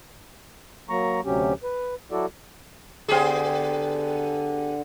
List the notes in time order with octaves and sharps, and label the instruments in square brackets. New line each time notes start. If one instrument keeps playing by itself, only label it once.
[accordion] F#3 A#3 A#5 C#6
D2 C3 F#3 C#4 G4
B4
F#3 E4 F#4 A4 D5
[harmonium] D3 [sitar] B3 G4 G#4